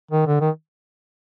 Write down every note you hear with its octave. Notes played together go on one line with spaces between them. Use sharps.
D#3
D3
D#3